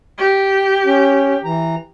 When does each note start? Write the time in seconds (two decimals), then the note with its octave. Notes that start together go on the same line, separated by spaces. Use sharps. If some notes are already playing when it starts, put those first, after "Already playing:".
0.18 G4
0.86 C#4
1.45 E3 A#5